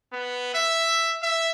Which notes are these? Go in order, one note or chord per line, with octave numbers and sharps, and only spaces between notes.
B3
E5
E5